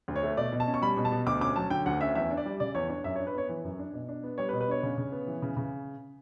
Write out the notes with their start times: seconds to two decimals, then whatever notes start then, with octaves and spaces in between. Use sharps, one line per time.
0.08 D2
0.16 C#5
0.23 A3
0.37 B2 D5
0.52 B2
0.60 A5
0.67 C#4
0.74 C#6
0.82 G3 B5
0.97 B2
1.05 A5
1.12 B2
1.26 D2 D6
1.41 C#4 D6
1.56 F#3 A5
1.70 D3 G5
1.86 D2 F#5
2.01 C#4 E5
2.15 E2 E5
2.30 D4
2.37 D5
2.46 G3
2.60 C#3 D5
2.75 E2 C#5
2.89 D4 C#5
3.04 F#2 E5
3.16 C#5
3.19 D4
3.27 B4
3.34 B3 C#5
3.49 E3
3.64 F#2
3.79 D4
3.93 B2
4.09 D4
4.24 B3
4.38 G3 C#5
4.49 B4
4.53 B2
4.61 B4
4.68 D4 C#5
4.83 C#3
4.97 C#3
5.12 B3
5.27 E3
5.42 C#3
5.57 C#3